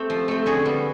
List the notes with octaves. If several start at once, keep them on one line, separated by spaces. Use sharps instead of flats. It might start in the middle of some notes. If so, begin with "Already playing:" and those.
Already playing: A3 C4 G4
F3
A3 C4
D3 F#4 G#4
G3 B3